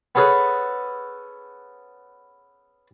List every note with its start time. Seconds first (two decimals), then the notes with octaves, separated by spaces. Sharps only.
0.15 B3 C#4 G#4 A4 B4